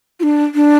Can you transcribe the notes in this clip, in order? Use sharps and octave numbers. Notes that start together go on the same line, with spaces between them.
F4
D4
D4